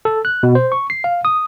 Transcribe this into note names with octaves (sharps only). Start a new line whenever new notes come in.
A4
F#6
B2
C5
C#6
C7
F5
D#6